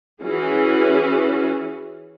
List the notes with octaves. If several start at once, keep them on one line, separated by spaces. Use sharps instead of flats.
E3 C#4 F#4 G#4